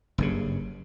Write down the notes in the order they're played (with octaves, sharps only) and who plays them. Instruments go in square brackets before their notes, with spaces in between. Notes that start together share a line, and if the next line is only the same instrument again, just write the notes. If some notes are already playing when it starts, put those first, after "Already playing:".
[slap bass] F#1 G2 C#3